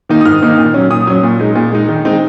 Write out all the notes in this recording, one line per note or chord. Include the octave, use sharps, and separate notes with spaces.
D#3 A#3 D#4
D#6
G#2 F6
D#3 A#3 D#4
A#2
F#3 C#4
A#2 D#6
F#3 C#4
A#2
G#3 D#4
A#2
G#3 D#4
D#3
G#3 C4 D#4